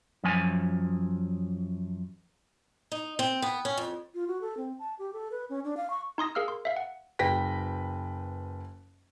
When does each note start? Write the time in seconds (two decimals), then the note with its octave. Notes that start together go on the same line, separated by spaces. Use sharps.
0.24 F#2 F3 G#5
2.92 D#4
3.19 C4
3.42 B3
3.65 C#4
3.77 F2
4.14 F4
4.27 F#4
4.41 A4
4.57 C4
4.79 A5
4.99 G4
5.13 A4
5.31 B4
5.50 C#4
5.64 D4
5.77 F5
5.90 C#6
6.18 D#4 C6 D#6 A#6
6.35 G#4 A#4 F5 E6 F6
6.48 C6
6.65 E5 F5
6.76 F#5
7.19 F#1 B4 G5 A#6 B6